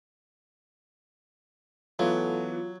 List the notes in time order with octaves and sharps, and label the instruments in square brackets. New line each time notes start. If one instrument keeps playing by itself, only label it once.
[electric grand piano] E3 B3 [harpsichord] F#3 [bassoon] A3 [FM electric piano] F4